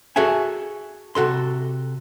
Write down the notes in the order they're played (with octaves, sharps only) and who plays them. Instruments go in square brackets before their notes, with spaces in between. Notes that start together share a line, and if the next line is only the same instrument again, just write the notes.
[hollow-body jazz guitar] F#4 G#4 A4 E5 G#5
C3 F#4 A4 C6